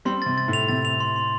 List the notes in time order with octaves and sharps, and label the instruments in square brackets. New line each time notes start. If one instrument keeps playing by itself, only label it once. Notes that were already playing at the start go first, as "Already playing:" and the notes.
[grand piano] G3 C4 [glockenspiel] C6
[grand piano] C3 [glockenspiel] A6
[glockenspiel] A6
[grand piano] A2
[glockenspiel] F7
[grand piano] C3 [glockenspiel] A6
[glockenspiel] F7
C6
C6